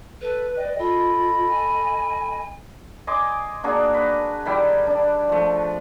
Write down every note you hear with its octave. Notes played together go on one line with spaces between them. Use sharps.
A4 B4
D5 D#5 G5
F4 A4 D#5 B5
G#5
D#5 G#5 C6 D6
A#3 D4 F#4 G#4
B4
D#3 G3 E4 G5
D4
F3 A3